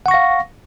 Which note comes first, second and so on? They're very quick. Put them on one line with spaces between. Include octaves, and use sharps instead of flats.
F#5 C#6 A#6 F5